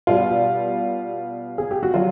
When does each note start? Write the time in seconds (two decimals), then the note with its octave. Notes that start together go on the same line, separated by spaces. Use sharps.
0.07 B2 G3 F4
1.58 G#4
1.71 G4
1.83 F#4
1.94 F#3 F4